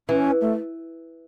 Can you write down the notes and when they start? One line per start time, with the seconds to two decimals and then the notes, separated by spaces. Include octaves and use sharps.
0.09 E3 C#4
0.41 A3